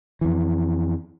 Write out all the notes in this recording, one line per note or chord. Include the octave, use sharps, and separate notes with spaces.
F2 E3